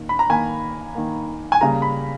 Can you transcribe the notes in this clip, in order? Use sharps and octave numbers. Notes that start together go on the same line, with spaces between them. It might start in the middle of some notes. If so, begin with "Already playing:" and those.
Already playing: D#3 A#3
B5
A#5
D#3 A#3 G#5
D#3 A#3
G#5
C#3 G3 A#3 A#5
B5